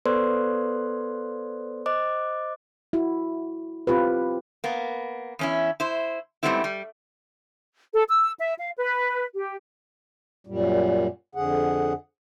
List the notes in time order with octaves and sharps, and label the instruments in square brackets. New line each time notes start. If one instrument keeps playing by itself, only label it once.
[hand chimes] B3 A4 B4 C5 D5 C6
C5 D#5 D6
[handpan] E4 F#4
C4 F4 G4 B4
[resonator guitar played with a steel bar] A#3 B3
E2 C#4 E4
E4 C5
G#2 G3 A3 B3 C4 E4
G3
[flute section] A4
E6
E5
F5
B4
G4
[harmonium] F#2 A#2 G3
F2 D3 G#4 F#5